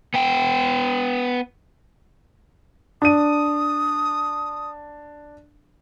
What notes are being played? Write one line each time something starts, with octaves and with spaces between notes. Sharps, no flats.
B3 G5
D4 D#6 D#7